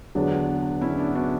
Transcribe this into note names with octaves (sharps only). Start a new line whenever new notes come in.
E2 D3 F#3 B3 D4
C#4 E4
B3 D4
D4 F#4